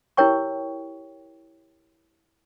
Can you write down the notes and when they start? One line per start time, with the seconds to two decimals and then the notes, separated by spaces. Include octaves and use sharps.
0.17 E4 G4 A#4 C#5 G5 C#6